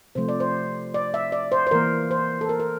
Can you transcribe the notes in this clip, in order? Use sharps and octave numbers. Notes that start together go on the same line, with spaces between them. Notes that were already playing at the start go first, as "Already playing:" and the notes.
C3 F3 A3 C5
D5
C5
D5
E5
D5
C5
C5
E3 A#3 A#4
C5
A4
A#4
A#4